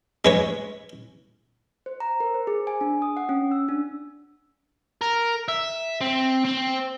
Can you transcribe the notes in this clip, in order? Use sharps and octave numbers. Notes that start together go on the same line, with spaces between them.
G#3 B4 C#5
C5
A#5
A#4
C5
G#4
G#5
D4
D#6
F#5
C#4
E6
D4
A#4
E5
C4
C4